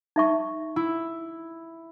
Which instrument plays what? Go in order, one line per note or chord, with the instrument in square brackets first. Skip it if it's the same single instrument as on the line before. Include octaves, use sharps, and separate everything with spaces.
[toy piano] D#4 E5 C#6
[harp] E4